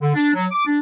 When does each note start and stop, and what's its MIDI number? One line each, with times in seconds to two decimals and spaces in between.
0.01 0.12 50
0.15 0.30 62
0.35 0.46 54
0.52 0.62 86
0.65 0.79 62